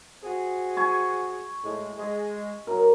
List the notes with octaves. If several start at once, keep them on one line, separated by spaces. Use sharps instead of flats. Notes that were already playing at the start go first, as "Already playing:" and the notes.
C4 F#4 G#4
G#5 C#6
A2 G#3
G#3
F#2 A#4